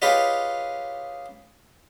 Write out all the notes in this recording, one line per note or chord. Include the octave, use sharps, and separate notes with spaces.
F4 G4 G#4 B4 C#5 D#5